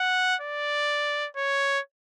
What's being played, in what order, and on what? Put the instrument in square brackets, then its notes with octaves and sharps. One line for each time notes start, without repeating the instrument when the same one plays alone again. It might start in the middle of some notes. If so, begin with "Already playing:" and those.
Already playing: [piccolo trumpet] F#5
D5
C#5